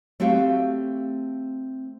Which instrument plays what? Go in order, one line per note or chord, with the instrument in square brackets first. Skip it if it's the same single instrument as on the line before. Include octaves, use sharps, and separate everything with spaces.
[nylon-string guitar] A3 C4 F#4 G4 F5